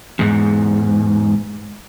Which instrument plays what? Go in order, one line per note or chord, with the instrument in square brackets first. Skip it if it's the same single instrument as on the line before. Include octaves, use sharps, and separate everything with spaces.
[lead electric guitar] E2 G#2